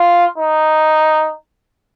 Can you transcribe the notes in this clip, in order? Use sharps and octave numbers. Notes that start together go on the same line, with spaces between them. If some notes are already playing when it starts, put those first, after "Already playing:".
Already playing: F4
D#4